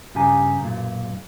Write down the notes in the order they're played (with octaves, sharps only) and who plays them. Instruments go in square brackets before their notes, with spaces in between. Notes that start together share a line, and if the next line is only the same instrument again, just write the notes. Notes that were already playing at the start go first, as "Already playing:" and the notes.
[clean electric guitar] G2 C#3 G4 G#5 A#5
B1 F#2 A#2